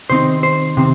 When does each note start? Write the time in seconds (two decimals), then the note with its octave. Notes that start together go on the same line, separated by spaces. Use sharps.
0.10 C3 D#3 C4 D#4 C5
0.43 C5
0.77 C3 D#3 C4